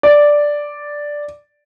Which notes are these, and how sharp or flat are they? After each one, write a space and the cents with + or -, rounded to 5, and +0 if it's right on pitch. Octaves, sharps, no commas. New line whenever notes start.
D5 +0